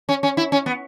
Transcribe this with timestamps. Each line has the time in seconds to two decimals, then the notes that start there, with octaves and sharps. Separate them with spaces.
0.09 C#4
0.23 C#4
0.37 E4
0.52 C#4
0.66 B3